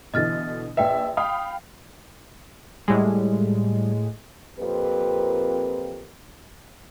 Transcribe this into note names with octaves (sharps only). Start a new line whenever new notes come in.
B2 D3 E3 D#5 F6 A6
A#1 B4 E5 G5
F5 G5 B5 D#6
A2 G3 G#3
F2 A#2 C4 G4 A#4 B4